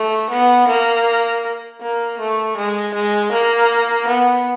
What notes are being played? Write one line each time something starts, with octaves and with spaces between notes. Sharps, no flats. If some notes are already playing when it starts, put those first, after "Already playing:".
Already playing: A3
B3
A#3
A#3
A3
G#3
G#3
A#3
B3